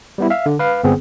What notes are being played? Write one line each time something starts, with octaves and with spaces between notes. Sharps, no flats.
G3 B3 E4
E5 F5
D3
B4 F5
G1 B3 C4 G#4